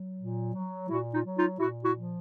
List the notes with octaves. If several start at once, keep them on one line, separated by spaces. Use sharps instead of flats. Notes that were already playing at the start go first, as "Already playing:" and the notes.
Already playing: F#3
A#2
F#3
A#2 E4 F#4
D#4 F4
F#3
D#4 F4
A#2 E4 F#4
E4 F#4
F3